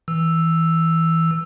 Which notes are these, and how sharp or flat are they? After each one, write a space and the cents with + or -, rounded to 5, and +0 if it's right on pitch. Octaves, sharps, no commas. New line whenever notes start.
E3 -20 E6 +0